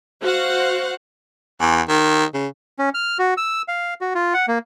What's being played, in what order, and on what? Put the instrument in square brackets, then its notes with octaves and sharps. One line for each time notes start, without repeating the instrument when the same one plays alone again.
[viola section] F#4 C5 F5 F#5
[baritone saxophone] E2
D#3
C#3
[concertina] C#4
F6
F#4
E6
F5
F#4
F4
F#5
A#3